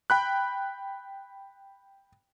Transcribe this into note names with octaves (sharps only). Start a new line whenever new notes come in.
G5 B5 F#6